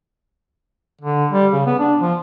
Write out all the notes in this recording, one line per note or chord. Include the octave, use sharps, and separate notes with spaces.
D3
G3
C#3
B3
D4
F3